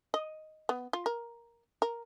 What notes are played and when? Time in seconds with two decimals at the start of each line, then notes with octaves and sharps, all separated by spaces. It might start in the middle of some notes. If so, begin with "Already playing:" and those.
0.14 D#5
0.69 B3
0.93 F4
1.06 A#4
1.82 A#4